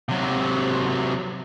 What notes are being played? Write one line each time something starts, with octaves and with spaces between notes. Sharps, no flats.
C3 F#3